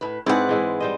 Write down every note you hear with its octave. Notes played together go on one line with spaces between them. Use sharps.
A2 B4
G#2 C4 E4 G#4 B4 D5 F#5
E3 G#3 E4
G3 C5 D#5